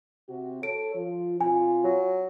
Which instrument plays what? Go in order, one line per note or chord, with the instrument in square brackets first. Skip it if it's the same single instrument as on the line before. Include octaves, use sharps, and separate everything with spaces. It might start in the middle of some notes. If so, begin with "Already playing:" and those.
[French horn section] C3 C4 F#4
[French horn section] A4 C#5 [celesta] D7
[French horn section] F3 F4
[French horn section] B2 C4 F4 [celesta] G#5
[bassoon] F#3